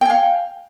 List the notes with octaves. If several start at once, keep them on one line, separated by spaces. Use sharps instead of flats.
F5 G5 G#5